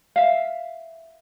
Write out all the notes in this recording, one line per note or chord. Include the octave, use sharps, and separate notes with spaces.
E5 F5